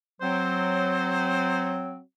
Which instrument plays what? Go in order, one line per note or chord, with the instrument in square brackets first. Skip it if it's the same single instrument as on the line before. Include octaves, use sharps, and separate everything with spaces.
[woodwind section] F#3 C4 [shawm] C5